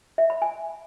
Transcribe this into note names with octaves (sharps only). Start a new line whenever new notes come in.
E5
B5
G#5